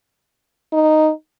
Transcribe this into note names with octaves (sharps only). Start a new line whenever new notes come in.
D#4